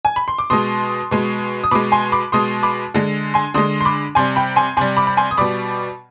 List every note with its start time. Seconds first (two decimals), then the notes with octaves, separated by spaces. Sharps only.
0.05 G#5
0.16 B5
0.28 C6
0.38 D6
0.50 B2 G#3 C6 D#6
1.11 B2 G#3
1.64 D#6
1.71 B2 G#3 B5 D6
1.92 G#5 C6
2.12 B5 D6
2.32 B2 G#3 C6 D#6
2.63 B5 D6
2.94 D3 G#3
3.34 G#5 C6
3.54 D3 G#3 C6 D#6
3.81 C6
3.85 B5 D6
4.15 C3 G3 G#5 C6
4.36 G5 B5
4.56 G#5 C6
4.77 C3 G3 G#5 C6
4.97 B5 D6
5.07 B5
5.17 G#5 C6
5.31 D#6
5.37 B2 G3 B5 D6